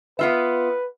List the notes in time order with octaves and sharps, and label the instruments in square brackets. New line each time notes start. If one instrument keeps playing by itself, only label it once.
[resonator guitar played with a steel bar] B3 F4 E5 [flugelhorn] B4